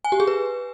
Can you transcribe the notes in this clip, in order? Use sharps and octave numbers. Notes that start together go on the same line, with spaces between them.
G#5
G4
G#4
B4